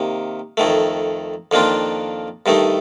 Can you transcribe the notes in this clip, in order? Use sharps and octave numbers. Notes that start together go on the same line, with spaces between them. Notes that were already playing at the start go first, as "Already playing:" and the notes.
Already playing: C3 D#3 A#3
F2 D#3 A3
F2 D#3 A#3 D4 F4
G2 D#3 A3 D#4